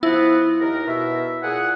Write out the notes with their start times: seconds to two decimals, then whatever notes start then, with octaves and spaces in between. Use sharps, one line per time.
0.03 F3 B3 E4
0.60 D#2 A#4
0.87 B2 E5
1.43 A#2 G#4 F#5